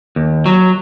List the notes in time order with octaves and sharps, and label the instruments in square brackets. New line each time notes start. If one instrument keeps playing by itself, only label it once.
[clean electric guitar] D#2
F#3